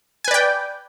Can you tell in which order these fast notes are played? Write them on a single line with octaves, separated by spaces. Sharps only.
G#5 B4 D5 G5